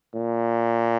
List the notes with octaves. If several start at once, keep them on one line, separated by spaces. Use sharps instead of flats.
A#2